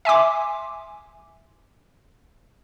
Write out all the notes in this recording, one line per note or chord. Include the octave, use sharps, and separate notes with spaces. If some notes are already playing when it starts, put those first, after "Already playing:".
E5 G#5 C6 D6